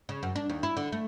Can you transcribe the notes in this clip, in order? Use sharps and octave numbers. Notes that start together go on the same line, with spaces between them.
C#3
F#2
D4
D#2
E4
D3
A3